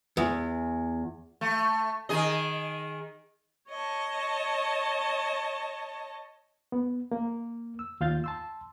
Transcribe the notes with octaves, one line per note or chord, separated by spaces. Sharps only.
E2
A3
D#3 G#4 D#5
C#5 D#5 A5
B3
A#3
E6
D#2 F4 F5 G6 A6
A5 C6 E6